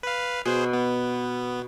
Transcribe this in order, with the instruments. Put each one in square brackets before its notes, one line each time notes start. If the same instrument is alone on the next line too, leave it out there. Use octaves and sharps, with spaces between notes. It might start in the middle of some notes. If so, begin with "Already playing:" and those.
[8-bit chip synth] B4 F5
[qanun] B2 [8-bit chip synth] G#4 C5
[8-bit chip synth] B3